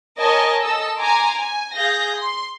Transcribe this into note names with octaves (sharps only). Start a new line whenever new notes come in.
A#4 C#5 D#5 G#5 A5
A4 D#5 E6
G#5 A#5 C6 D6
G#5
G#4 F5 G6 A#6
C6